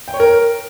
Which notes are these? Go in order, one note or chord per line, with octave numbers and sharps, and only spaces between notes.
G5
C#5
A#4